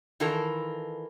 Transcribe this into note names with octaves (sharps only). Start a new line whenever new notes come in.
D#3 E3 F4 A4 A#4